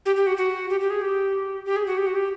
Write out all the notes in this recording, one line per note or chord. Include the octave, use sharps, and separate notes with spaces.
G4
G4
F#4
F#4
G4
G4
G#4
G4
G4
G#4
F#4
G4
F#4
G4